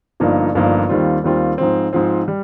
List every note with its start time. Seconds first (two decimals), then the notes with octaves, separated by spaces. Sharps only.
0.20 G1 G2 F3 A#3 D#4
0.55 G1 G2 F3 A#3 D#4
0.89 D#2 D#3 G3 C4 F4
1.24 D#2 D#3 G3 C4 F4
1.58 G#2 F3 C4
1.93 G#2 F3 C4
2.28 G3